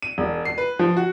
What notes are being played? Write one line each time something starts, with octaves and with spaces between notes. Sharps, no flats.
D#7
E1
C7
B4
F3
F#4